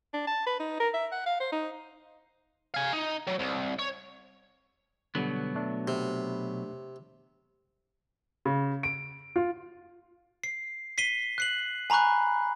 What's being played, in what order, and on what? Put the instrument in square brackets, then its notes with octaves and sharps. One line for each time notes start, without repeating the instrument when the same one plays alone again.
[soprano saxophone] D4
A5
B4
D#4
A#4
E5
F#5
F5
C5
D#4
[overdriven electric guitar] F5 G#5
D#4
F#3
C2
C#5
[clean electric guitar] B2 F#3 B3 [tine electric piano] D3 G3
[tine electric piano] A3 D4
[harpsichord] C3
[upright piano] C#3
D7
F4
[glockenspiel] C7
B6 C7 D#7 G7
F#6 C7 F#7
G#5 A#5 B5 C#6 F#6